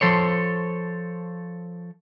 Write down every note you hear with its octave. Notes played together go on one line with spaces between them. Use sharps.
F3 A4 C5 C#5